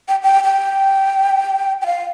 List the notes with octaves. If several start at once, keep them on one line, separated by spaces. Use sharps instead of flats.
G5
G5
G5
G5
F5